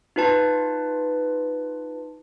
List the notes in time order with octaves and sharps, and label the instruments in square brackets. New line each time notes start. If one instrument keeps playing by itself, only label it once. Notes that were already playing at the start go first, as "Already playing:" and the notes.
[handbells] D#4 F4 B4 A5